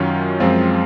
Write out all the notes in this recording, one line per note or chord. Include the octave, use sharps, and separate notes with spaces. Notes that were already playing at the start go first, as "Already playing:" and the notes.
Already playing: F#2 D#3 F#3 C#4 F4
F#2 F3 G#3 C4 F4